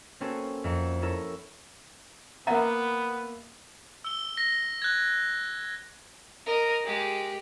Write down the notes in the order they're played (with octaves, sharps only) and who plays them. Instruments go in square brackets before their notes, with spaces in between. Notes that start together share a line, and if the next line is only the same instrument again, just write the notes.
[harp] A#3 C4 C#4 F#4 A4 B4
F2 E5 F#5 A#5
C#4 E4 A4 A#4
[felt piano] A#3 E5 [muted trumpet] B3 [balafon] F#5 A#5
[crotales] E6 G7
A#6
F#6 G#6
[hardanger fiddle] A#4 D#5
G#3 G4